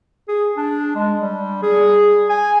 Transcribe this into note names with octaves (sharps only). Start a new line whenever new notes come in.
G#4
D4
G#3
G3
G#4
G#5